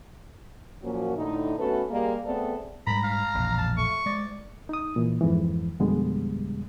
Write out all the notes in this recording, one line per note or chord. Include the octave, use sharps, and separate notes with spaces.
A#2 F3 F#3 A#3 C#4 F#4
A2 D3 D#4
A3 B3 C#4 F#4 A4 B4
G3 G#3 A#3
A3 B3 C4 G#4 A4 D5
G#2 G3 A#5 B5
F5
E1 A#1 F2
A5
A3 C#6
G#3 D5
D#4 D#6
A#2 E3
F2 G#2 E3
F2 B2 D3 G3 G#3 B3